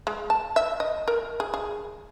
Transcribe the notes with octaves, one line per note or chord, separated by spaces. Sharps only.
G#3
A5
E5
D#5
A#4
G#4
G#4